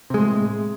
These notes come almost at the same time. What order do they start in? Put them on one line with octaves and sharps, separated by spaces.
C3 G#3 A2